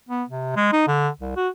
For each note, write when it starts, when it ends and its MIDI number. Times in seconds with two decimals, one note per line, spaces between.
0.09 0.23 59
0.29 0.53 48
0.56 0.68 56
0.73 0.85 63
0.87 1.09 50
1.20 1.35 36
1.36 1.49 66